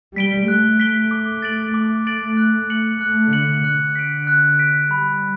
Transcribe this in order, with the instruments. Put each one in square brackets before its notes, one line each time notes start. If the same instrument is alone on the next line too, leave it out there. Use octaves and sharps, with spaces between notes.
[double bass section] G3 [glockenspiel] B6 D7 G7
[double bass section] A3 [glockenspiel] F#6
[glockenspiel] B6 D7 G7
D6
A6 D7 F#7
[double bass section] A3 [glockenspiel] D6
[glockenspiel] A6 D7 F#7
F#6
C#7 F#7
[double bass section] A3 [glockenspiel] F#6
[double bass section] D3 [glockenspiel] C#7 F#7
[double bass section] D3 [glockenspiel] F#6
[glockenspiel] B6 D7
F#6
B6 D7
[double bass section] G3 [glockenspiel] B5